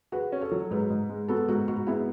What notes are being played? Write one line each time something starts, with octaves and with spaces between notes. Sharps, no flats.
F#4 G#4 B4
C#4
A4 C#5
F#3
G#2 G#4 B4
G#2
G#3
B3 F#4 A4
G#2 F#4
G#2 F#4
B3 E4 G#4